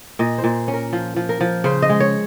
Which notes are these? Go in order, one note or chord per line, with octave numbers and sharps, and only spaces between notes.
A#2 D#5
C5
A#2
C#4
A#4
F3
F3
A#4
F3
C#3 C5
D#5
G#3
C#5